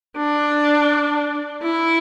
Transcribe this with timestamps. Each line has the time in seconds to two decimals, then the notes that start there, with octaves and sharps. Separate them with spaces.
0.17 D4
1.62 E4